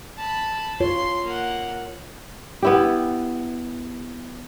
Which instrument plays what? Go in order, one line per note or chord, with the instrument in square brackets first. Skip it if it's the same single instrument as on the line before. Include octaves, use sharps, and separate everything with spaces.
[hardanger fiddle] A5 B5
[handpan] F4 C#5 [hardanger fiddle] C6
[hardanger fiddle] A#3 F#5
[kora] B3 E4 G4